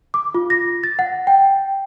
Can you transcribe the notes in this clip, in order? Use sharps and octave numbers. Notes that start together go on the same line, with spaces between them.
D6
F4
A#6
A6
F#5
G5